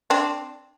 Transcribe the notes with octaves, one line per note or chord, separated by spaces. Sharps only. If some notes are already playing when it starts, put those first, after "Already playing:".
C4 D4